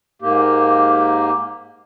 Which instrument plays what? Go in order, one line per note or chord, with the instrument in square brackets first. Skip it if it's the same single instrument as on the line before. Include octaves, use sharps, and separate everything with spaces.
[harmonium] G#2 A#3 G4